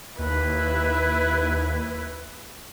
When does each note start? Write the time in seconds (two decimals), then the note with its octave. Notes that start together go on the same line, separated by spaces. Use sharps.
0.19 D#2 E4 B4